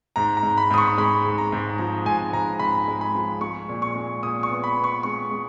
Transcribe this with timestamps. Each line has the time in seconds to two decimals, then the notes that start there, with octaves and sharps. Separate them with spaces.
0.16 G#2 A#5
0.37 A#5
0.43 G#2
0.58 B5
0.71 G#2 D#6
0.78 C#6
0.98 G#3 B5
1.24 G#2
1.38 A#5
1.52 G#2
1.78 F3 A#5
2.06 G#2 G#5
2.33 G#2 A#5
2.59 G#2 B5
2.88 G#3
3.01 B5
3.15 F3
3.41 G#3 C#6
3.69 A#2
3.82 C#6
3.95 G#3
4.22 A#2 D#6
4.43 C#6
4.49 B3
4.64 B5
4.77 B3
4.84 C#6
5.03 G#3 C#6
5.31 G#3